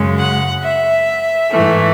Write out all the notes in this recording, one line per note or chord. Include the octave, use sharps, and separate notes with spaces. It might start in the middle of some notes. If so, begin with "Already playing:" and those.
Already playing: F#2 C#3 G#3
F#5
E5
G#2 E3 A3